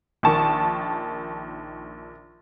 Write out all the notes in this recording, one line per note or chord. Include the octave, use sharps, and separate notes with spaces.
A#1 D#3 A5 C#6